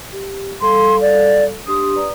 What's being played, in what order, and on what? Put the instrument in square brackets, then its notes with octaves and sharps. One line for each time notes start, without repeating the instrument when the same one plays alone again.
[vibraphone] G4
[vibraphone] G3 A4 F5 [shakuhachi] C6
[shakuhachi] D5
[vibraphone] D4 G4 C6 [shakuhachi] D#6
[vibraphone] B4 D5 A#5